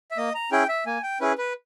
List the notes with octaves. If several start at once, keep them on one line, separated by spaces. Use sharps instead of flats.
E5
A#3 D#5
A#5
C#4 E4 G#4 G5
E5
A#3 G#5
G5
C#4 E4 G#4 B4
B4